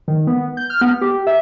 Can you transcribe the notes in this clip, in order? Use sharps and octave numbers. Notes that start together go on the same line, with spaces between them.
D#3
B3
G6
F6
B3
G4
E5